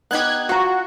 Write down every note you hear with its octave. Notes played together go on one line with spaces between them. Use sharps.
B3 D#4 G4 F#6 G#6
F4 F#4 A#5